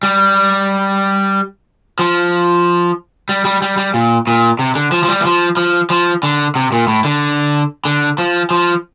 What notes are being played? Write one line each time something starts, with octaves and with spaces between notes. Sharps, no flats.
G3
F3
G3
G3
G3
G3
A#2
A#2
C3
D3
F3
F3
G3
E3
F3
F3
F3
D3
C3
A#2
A2
D3
D3
F3
F3